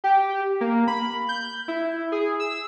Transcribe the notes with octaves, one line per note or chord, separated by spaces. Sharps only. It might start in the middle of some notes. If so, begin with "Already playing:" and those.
G4
A#3
B5
G6
E4
G#4
E6